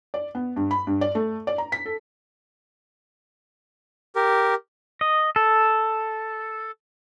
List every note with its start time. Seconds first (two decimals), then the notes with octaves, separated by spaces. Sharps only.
0.14 D5
0.35 B3
0.56 G2
0.71 B5
0.87 G2
1.01 D5
1.15 A3
1.47 D5
1.58 A#5
1.72 B6
1.86 A4
4.16 G4 A#4
5.01 D#5
5.36 A4